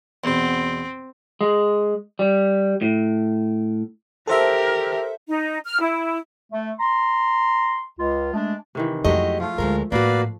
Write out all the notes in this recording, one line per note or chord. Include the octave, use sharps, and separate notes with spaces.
E2 B2 C4
G#3
G3
A2
G4 A4 A#4 C5 E5
D#4
F6
E4
A3
A#5 C6
C#2 F4
G#3 A3 D4
C3 D#3 E3
F2 F#3 G#3 A3 G4 D#5
F3 A3 F4
D2 D3 G#3 A#4
A2 A#3 F#4 B4 D5 F5